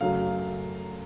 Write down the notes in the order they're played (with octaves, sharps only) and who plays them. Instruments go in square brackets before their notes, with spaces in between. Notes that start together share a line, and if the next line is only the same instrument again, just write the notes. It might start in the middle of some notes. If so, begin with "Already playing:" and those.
[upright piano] F#2 C#3 F#3 A3 F5